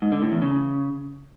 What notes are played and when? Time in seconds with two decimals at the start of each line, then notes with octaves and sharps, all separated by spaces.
0.02 G#2
0.12 D3
0.22 A2
0.32 E2
0.42 C#3